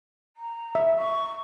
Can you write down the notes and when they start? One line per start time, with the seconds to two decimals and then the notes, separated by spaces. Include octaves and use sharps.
0.36 A#5
0.75 E5
0.98 C#6